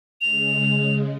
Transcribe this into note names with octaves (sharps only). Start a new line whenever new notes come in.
C#3 G#3 F7